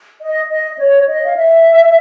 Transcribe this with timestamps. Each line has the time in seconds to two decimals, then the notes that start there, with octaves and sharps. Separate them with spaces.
0.21 D#5
0.51 D#5
0.79 C#5
1.07 D#5
1.26 F5
1.37 E5